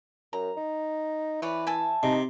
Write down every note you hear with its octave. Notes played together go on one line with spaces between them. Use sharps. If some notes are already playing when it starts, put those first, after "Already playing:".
F#2 A#5
D#4
E3 B4 C#5 D5
E5 G#5 A5
C3 D#4